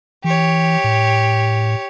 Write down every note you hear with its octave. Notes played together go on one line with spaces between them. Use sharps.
E3 G4 C#5
A2